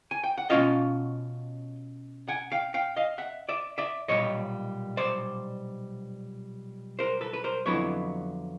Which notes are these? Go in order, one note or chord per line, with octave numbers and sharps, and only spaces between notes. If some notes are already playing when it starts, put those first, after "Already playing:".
G#5
G5
F#5
B2 G#3 C#4 F4 D#5 F5
F#5 G#5
F5 G5
F5 G5
D#5 F5
E5 F#5
D5 E5
D5 E5
B1 A#2 G3 C#5 D#5
C5 D5
A#4 C5
A4 B4
B4
A#4 C5
F2 D3 F#3 B3 E4 B4 C#5